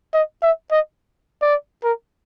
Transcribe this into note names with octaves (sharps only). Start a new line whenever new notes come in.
D#5
E5
D#5
D5
A#4